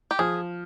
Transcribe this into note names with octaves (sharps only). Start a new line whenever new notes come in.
G4
F3 G#4